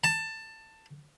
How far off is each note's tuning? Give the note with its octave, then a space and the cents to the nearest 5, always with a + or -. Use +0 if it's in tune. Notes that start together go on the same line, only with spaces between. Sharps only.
A5 +15